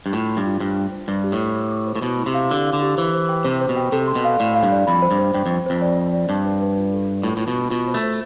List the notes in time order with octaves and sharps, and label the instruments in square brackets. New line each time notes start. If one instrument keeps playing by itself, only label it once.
[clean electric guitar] G2
[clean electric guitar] A2 [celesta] F4
[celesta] C6
[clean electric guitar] G2
[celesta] F4
[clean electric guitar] G2 [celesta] C5
[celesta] G5
C5
[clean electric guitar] G2 [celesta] D6
[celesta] G4
[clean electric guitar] A2
[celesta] C5
D6
D6
C5
[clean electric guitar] A2
[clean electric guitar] B2 [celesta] E4
[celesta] E4
[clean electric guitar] C3
[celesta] F5
[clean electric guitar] D3 [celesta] G4
[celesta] F5
[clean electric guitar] D3
[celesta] G4
[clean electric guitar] E3 [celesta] C5
[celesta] C5
G5
[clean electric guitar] C3 [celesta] C5
[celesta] C5
[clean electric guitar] B2
[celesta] G5
[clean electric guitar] C3 [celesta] A4
[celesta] C6
[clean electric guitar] B2
[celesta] F5
[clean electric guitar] A2 [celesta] D5
[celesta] F5
[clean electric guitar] G2
[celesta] D5
[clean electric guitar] F2 [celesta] B5
[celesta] C5
[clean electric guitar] G2
[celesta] C5
[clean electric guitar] G2 [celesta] G5
[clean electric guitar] F2
[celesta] C5
[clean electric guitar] F2 [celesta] C5
[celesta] D5
D5
D5
[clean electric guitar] G2 [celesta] A5
[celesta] B4
B4
F4
A4
D4
[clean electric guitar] A2 [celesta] F4
[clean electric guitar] A2 [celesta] F4
[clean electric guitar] B2
[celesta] D4
[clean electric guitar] B2 [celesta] F4
[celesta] C5
[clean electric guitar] A3
[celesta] C5